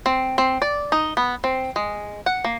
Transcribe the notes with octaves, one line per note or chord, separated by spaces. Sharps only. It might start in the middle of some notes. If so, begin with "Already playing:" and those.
C4
C4
D5
D#4
B3
C4
G#3
F#5
A#3